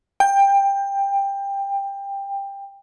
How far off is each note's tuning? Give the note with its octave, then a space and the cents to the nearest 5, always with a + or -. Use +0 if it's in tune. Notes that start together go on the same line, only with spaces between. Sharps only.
G5 +20